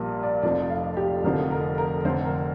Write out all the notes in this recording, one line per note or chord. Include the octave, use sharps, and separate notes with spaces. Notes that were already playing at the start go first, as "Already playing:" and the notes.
Already playing: A#1 A#2 G3 A#4
D5
F1 F2 F3 D5
F5
G4
F1 F2 D3 F3 A#4
A#4
A#4
F1 F2 D3 C5
A#4